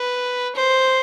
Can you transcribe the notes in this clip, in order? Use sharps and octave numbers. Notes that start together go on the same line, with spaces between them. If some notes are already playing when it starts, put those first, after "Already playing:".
Already playing: B4
C5